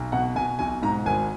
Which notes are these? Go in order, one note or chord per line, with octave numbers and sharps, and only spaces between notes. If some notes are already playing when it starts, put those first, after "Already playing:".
Already playing: B1
B2 F#5
B2 G#5
B1 G#5
G#2 A#5
G#1 G#5